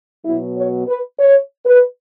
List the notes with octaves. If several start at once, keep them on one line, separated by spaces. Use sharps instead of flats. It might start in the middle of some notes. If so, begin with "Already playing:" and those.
B2 F#3 B3 E4
C#5
B4
C#5
B4